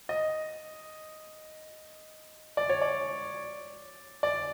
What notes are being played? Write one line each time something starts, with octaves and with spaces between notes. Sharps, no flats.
D#5
D5
C#5
D5
D5